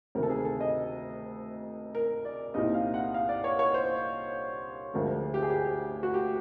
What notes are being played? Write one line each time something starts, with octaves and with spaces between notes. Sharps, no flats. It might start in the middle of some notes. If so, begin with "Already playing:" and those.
D2 C3 D#3 A#4
A4
G#4
A4
D#5
A#4
D5
C2 A#2 G3 C4 D#4 D#5
F5
F#5
F5
D5
C#5
C#5
C5
D2 D3 F3 G#3 A#4
G4
G#4
G4
F#4
G4